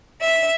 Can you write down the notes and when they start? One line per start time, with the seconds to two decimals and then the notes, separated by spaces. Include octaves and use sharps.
0.20 E5